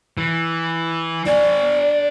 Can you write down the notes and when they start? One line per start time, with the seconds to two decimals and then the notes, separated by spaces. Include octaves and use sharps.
0.17 E3
1.26 D4 D5 G#5